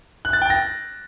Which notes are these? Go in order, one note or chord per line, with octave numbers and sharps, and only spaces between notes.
F#6
A6
G5
A#6